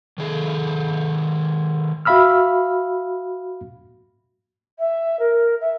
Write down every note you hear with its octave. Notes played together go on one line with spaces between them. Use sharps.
D#3 G#4 A4
F#4 E5 F5 B5 E6 F6
E5
A#4
E5